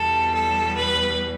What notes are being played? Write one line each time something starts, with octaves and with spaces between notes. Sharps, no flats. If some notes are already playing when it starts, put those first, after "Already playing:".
Already playing: E2 B2 G3 A4
A4
B4